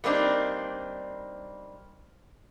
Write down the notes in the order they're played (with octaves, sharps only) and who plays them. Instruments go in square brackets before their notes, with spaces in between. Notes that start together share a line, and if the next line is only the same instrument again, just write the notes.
[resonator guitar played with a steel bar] G3 A#3 C4 D4 D#4